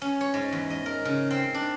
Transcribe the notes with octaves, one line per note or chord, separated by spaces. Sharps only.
C#4
C#5
G#2
E2
D#5
A#4
C#3
C4
D4